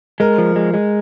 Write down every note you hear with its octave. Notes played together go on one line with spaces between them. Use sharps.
G#3 A#4
F3
G#3
G#3